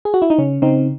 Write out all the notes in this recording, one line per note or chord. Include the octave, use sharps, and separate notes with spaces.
G#4
F#4
E4
D#4
C#3 C#4
C#3 C4 D#4